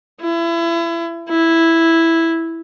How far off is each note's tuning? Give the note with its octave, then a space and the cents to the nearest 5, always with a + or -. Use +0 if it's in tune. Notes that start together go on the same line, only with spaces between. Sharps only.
E4 +30
E4 +0